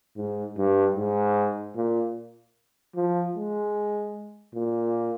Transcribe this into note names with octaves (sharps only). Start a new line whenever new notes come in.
G#2
G2
G#2
A#2
F3
G#3
A#2